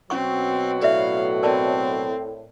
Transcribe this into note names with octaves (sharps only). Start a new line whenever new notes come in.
B2 F#3 C4 C#4 F#5 C#6
A2 D5 E5 F5
C4 A#4 D5 A5